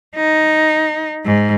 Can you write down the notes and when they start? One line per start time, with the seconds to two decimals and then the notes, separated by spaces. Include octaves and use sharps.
0.16 D#4
1.25 G#2